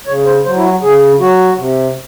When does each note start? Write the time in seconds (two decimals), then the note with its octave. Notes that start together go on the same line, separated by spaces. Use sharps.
0.07 C#3 C#5
0.26 C5
0.45 F#3 C5
0.56 E4
0.64 F#4
0.82 C#3 G#4
1.20 F#3 F#4
1.58 C3